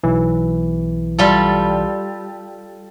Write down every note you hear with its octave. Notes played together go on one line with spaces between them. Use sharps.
B1 E3
G3 F4 A4